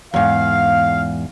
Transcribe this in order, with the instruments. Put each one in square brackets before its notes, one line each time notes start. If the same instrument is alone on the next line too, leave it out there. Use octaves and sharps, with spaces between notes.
[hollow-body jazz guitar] E2 G#2 [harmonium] F5